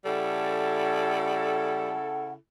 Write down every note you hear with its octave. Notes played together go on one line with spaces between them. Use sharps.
C#3 G3 E4 A4 F#5